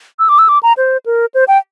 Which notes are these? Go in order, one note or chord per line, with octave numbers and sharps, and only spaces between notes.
E6
D6
E6
D6
A#5
C5
A#4
C5
G5